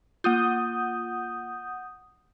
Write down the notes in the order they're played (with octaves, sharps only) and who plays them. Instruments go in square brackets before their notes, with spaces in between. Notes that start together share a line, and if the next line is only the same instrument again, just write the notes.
[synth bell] A#3 F4 [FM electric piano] F#5 D#6 G6